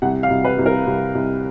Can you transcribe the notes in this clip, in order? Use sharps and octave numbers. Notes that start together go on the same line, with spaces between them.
C2 F#5
F5
C2
B4
C2
A#4
C2
C2